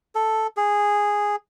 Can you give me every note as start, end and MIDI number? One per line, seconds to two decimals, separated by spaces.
0.15 0.47 69
0.57 1.36 68